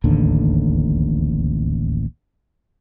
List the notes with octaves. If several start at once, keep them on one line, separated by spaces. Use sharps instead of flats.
D1 A1 D#2 D3